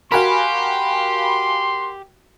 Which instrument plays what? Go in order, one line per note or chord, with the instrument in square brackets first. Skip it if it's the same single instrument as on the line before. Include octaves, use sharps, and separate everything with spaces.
[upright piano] F#4 A#4 [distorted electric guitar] G4 [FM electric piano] F5 G#5 B5 [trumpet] C6